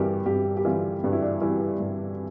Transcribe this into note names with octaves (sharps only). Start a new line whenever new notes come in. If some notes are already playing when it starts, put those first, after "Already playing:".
Already playing: G2 E3 G3 G4 A#4
G2 G4
G4
E3 G3 F4
G2 D4
E4
D4
E3 G3 E4
G2